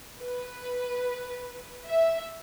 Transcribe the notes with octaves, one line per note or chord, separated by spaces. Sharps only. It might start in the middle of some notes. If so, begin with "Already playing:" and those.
B4
E5